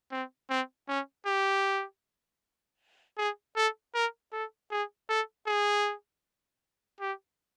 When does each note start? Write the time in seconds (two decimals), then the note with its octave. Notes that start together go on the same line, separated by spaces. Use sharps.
0.11 C4
0.50 C4
0.88 C#4
1.26 G4
3.18 G#4
3.56 A4
3.94 A#4
4.33 A4
4.71 G#4
5.09 A4
5.47 G#4
7.01 G4